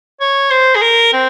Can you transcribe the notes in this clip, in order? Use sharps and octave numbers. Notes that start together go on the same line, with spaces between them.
C#5
C5
G#4
A#4
C4